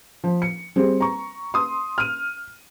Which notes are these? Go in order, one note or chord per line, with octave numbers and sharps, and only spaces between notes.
F3
C#7
G3 C4 G#4
A#5 C#6
C6 D#6
F6 D#7